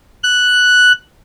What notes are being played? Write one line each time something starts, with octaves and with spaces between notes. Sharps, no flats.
F#6